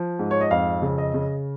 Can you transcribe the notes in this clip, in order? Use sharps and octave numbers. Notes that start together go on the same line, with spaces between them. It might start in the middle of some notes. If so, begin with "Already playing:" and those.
Already playing: F3
G#2
C#5
D#5
F2 F5
C#3
D#5
C#3